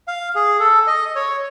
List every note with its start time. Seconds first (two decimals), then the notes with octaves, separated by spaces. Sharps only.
0.08 F5
0.35 G#4
0.60 A4
0.87 D#5
1.15 C#5